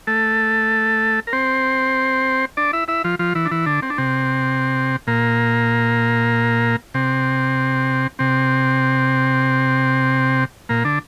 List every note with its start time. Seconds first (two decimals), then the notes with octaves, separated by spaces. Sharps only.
0.07 A3 A4
1.27 A#4
1.33 C4 C5
2.57 D4 D5
2.73 E4 E5
2.88 E4 E5
3.04 F3 F4
3.19 F3 F4
3.35 E3 E4
3.46 D4
3.51 E3 E4
3.66 D3 D4
3.82 C4
3.90 D4
3.98 C3 C4
5.07 A#2 A#3
6.94 C3 C4
8.19 C3 C4
10.69 A#2 A#3
10.85 D3 D4